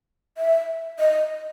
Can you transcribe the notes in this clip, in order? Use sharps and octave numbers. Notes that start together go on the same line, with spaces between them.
E5
D#5